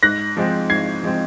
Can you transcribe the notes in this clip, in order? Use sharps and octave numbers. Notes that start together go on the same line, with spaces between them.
G#2 F#6 A#6
F3 G#3 C4
G#2 G#6 C7
F3 G#3 C4